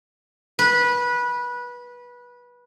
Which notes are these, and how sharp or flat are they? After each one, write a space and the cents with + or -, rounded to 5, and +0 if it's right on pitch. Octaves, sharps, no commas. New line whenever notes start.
B4 -20